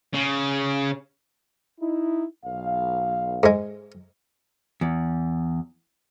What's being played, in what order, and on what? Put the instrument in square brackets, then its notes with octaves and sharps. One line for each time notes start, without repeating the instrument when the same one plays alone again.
[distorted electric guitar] C#3
[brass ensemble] D#4 E4
B1 F5
[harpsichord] G#2 G#3
[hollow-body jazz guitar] E2